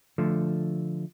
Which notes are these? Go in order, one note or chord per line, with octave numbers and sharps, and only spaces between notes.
D3 F3 A3